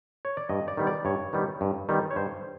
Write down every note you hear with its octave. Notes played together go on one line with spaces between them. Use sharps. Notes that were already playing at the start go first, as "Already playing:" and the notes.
C#5
D5
G2 D#5
D5
D#3 G3 B3
D5
G2 C#5
D#3 G3 B3
G2
D#3 G3 B3
C#5
G2 C5